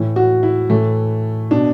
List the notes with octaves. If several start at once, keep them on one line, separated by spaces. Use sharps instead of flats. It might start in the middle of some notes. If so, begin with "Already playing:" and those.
Already playing: A2 E3
F#4
E4
A2 E3 A3
B2 D4